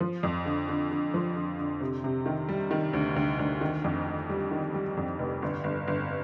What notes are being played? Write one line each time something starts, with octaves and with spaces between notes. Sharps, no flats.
F3
F2
D3
D3
D3
F3
D3
D3
C3
C3
D#3
G3
D#3
D2
D2
D2
D#3
F2
D#3
G3
D#3
G3
F2
F1
G1
G1
G1